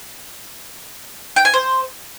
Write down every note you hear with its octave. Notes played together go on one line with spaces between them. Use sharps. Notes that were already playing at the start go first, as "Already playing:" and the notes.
G5
G#5
C5